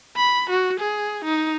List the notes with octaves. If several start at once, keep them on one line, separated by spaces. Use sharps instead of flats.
B5
F#4
G#4
D#4